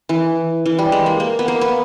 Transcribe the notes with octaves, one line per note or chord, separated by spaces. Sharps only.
E3
E3
G3
G#3
A#3
A#3
B3
A#3
B3